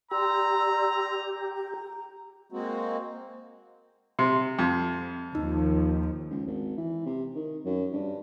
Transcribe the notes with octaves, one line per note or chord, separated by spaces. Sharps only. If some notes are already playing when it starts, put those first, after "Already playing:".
G4 D5 A#5 C6 E6
A#5
G#3 A#3 C4 F#4
C3
F2
D#2 F3 D#4
C#2
G#1
E3
C3
D#3
F#2
G2